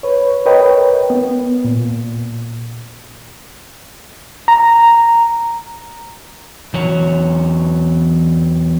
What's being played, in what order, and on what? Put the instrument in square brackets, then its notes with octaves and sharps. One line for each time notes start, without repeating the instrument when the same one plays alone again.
[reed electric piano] B4 C#5
A#4 B4 C#5 D#5 G5
B3
A#2
[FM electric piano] A#5
[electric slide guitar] E2 F#3 C#5